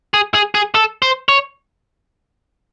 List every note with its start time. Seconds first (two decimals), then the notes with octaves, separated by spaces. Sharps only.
0.14 G#4
0.34 G#4
0.55 G#4
0.75 A4
1.02 C5
1.29 C#5